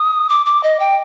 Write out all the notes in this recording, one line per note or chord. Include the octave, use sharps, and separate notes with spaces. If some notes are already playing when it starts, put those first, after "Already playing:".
Already playing: D#6
D6
D6
D#5
G5